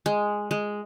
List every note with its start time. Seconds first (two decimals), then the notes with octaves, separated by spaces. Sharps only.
0.06 G#3
0.51 G#3